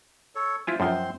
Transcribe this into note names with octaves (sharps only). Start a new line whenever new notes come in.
A4 C#5
E4 F4 C5 G#5
F#2 F3 C4 C5 C6